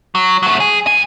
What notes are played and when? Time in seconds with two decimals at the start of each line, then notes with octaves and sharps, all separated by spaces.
0.15 F#3
0.43 F#3 A3
0.60 G#4
0.87 F#2 G#5